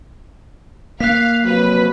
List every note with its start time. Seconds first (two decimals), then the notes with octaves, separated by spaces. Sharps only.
1.00 A#3 F5 F#6 B6
1.44 F2 C3 F#3 B4